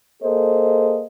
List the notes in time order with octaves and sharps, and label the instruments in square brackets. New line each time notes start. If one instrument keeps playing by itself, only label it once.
[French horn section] A#3 G#4 A4 C5 D#5